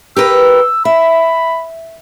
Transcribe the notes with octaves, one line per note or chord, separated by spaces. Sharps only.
G4 A#4 B4 E6
E5 B5